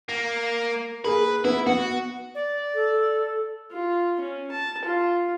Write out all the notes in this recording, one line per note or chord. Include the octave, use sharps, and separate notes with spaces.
A#3
A#3 G#4 A#4 B4
B3 E4
B3 F#4
D5
A4
F4
C#4
A5
F4